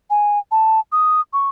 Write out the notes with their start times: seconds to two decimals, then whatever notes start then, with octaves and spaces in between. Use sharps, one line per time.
0.10 G#5
0.51 A5
0.92 D#6
1.33 C#6